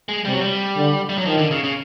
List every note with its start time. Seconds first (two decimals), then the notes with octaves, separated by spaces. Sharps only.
0.09 G#3
0.25 C3 G3
0.33 F#3
0.41 G3
0.76 D3
1.09 G3
1.18 F#3
1.25 D#3 F3
1.38 D3
1.51 C#3
1.64 C#3